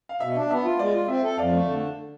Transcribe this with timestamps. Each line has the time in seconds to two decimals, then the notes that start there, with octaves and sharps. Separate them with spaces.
0.09 F5
0.20 B2 E5
0.35 D4
0.50 B3 E5
0.65 F4
0.79 G#3 D5
0.93 F4
1.08 C4 E5
1.24 A4
1.37 F2 D5 F5
1.52 A3
1.67 D3